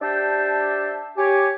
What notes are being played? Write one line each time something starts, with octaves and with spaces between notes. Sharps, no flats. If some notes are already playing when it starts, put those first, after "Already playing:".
D4 G4 C5 E5 G5 A5
G4 C#5 G#5